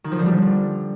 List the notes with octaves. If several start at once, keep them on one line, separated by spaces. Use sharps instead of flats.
D#3
F3
D3
G3